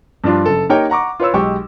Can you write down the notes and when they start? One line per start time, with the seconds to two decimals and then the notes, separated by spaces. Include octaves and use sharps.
0.24 G2 F3 D4 F4
0.46 F#1 A4
0.69 A#3 D#4 G4 A#4 C#5 G5
0.90 F#5 A#5 C#6 D6
1.20 F4 B4 C#5 E6
1.33 B1 G#3 G4 C#6